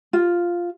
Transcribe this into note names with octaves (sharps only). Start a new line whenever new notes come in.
F4